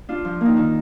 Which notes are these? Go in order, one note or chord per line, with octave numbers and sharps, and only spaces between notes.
D4 F4
F3
A#3 D#4
D#3